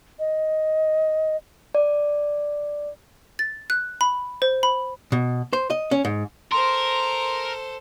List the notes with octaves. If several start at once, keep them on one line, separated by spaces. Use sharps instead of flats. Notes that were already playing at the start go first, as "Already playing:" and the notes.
D#5
D5
A6
F#6
B5
C5
B5
B2
C5
D#5
C#4
G#2
A4 A#4 C5 C6